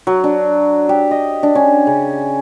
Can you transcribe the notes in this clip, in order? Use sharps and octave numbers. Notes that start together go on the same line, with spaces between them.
F#3
D4
G4
D#5
D4
C#4
C#3